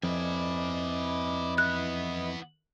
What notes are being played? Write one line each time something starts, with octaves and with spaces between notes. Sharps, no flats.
F2 E4 B4 D5 D#5 G#5
E3 B3 F#6